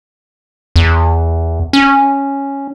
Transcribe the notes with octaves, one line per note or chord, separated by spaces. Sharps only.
E2
C#4